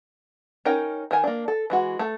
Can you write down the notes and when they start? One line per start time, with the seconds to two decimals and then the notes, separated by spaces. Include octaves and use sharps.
0.65 C#4 D#4 A#4 G5
1.11 D#3 A#4 G#5
1.24 A#3 D4
1.48 A4
1.70 E3 G#3 F#4
1.99 A3 A4